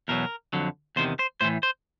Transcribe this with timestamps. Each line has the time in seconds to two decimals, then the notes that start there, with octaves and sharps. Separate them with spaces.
0.08 E2 B2 F#3 A#4
0.53 F2 D3 F#3
0.96 E2 C3 D#3 C5
1.19 C5
1.41 A2 E3 C5
1.63 C5